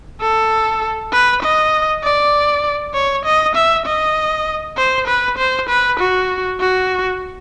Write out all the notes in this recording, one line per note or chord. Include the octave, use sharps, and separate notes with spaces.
A4
B4
D#5
D5
C#5
D#5
E5
D#5
C5
B4
C5
B4
F#4
F#4